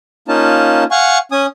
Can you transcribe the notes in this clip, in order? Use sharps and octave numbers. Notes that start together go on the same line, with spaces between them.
A#3 C#4 D#4 F4 A5
F5 F#5 G#5 C#6
C#4 G#5 D#6